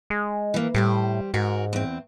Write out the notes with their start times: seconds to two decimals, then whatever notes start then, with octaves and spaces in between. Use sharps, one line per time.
0.10 G#3
0.54 E3 A#3
0.74 A2 G3 G4 C5
1.34 G#2 F#4 A#4
1.73 E2 C4